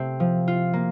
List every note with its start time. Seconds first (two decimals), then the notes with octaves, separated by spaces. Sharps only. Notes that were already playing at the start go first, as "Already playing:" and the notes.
Already playing: C3 A3 C4
0.20 F3
0.48 F4
0.73 A#3